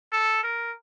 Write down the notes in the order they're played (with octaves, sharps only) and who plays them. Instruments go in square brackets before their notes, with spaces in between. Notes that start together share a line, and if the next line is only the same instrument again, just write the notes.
[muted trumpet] A4
A#4